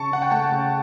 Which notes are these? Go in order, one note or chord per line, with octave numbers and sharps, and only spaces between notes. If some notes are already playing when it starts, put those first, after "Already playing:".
Already playing: C#3 A5 C#6
C#3 F#5
G5
A3 F#5 A5
C#3